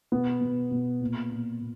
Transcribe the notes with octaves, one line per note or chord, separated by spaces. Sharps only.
B2 B3
B2
B2
A#2
A#2
A#2